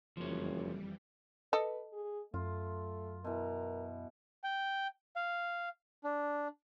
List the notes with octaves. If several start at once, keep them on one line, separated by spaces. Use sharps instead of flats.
F#1 F2 E3 F3 G3 C#4
A4 B4 D#5
G#4
F#2 A3 F4
B2 E3 A#4
G5
F5
D4